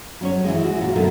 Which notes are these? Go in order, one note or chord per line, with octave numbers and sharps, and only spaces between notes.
F#3 C#4 C#5
E3 F3 G#3
F#4
A#2
B2 D3 F#3 A3 A#4 B4